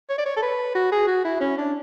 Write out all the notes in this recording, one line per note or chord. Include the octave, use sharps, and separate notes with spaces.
C#5
D5
C#5
A4
B4
F#4
G#4
F#4
E4
C#4
D4